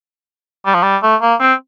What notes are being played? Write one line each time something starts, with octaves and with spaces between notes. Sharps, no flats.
G3
F3
G3
A3
A#3
C4